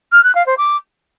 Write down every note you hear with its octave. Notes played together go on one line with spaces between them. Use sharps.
F6
F#6
F5
C5
D6